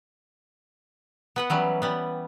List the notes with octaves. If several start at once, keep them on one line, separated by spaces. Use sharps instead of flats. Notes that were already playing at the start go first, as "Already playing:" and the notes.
B3 B4 F#5
E3 F#3 G3 C#4
G3 B3